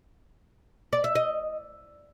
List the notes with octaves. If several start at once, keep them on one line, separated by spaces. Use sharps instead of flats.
D5
E5
D#5